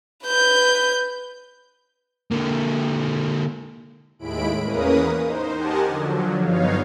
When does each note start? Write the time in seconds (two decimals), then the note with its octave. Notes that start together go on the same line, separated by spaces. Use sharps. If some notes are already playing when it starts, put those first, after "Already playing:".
0.25 B4 G6
2.31 D3 A#3
4.19 D#2 A2 G#3 E4 B5 D7
4.62 E2 A#3 C#4 A#4 B4 D#6
5.22 D#4 C5
5.55 G4 A#4 D#5 F#5 G#5 A5
5.87 D3 F3 F#3
6.42 G2 B3 D#4 C#5 F5